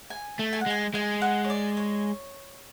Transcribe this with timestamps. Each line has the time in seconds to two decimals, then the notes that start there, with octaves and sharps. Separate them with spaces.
0.10 G#5
0.39 A3
0.53 G#5
0.61 F#5
0.66 G#3 G#5
0.94 G#3 G#5
1.22 F#5
1.45 C#5
1.50 D5
1.77 C#5